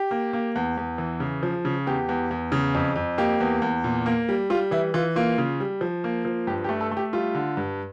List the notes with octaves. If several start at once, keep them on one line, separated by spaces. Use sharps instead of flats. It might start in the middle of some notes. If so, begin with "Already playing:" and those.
Already playing: G4
A#3
A#3
E2
E2
E3
C#3
F3
C#3
E2 G4
E2
E2
C#3
F2
F2
A#3 G4
E2
E2
A#2
A#3
G3
G3 F4
E3 E4
E3 F4
A#3 F4
C#3
G3
F3
A#3
F3
G2 G4
G4
A3
A4
A3
G4
G3 F4
D3
G2